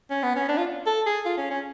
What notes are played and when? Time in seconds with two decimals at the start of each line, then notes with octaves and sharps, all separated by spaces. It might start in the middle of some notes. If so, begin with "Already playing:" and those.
0.11 C#4
0.23 B3
0.36 C#4
0.49 D4
0.58 F4
0.86 A4
1.06 G#4
1.25 F4
1.37 C#4
1.51 C#4